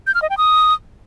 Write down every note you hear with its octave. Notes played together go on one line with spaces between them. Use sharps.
G6
F6
D#5
G5
D#6